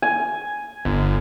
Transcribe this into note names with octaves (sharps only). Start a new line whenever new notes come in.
G#5
G1